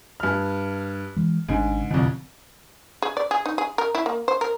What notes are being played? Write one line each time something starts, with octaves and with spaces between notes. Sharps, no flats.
G2 F6
E3 G#3
G#1 G#2 C#3 D4
C2 F2 D3 F3
G#4
D5
G#4
D#4
G#4
A#4
E4
A#3
C5
A#4